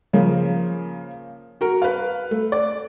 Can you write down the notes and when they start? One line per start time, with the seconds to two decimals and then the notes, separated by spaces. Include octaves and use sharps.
0.13 C#3 F3 A#3
1.61 F#4 A#4
1.82 B4 F5
2.31 A3
2.52 D5